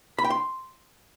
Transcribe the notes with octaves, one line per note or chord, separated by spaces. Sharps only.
B5
G5
C6